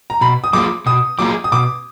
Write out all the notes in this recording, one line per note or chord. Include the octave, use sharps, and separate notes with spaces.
A#5
B2 B5
D#6
F#3 A#3 F4 G#4 D6
B2 D#6
F#3 A#3 F4 G#4 D6
D#6
B2 D6